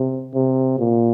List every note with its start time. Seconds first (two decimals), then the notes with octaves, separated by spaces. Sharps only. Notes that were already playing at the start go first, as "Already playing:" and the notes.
Already playing: C3
0.35 C3
0.79 A#2